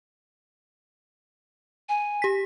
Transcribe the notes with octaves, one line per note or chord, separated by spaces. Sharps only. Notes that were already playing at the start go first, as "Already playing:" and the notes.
G#5
G4 B6